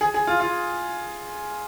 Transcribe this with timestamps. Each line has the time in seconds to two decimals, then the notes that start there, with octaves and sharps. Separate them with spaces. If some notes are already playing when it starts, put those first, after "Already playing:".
0.01 G#4
0.14 G#4
0.27 F4
0.40 F4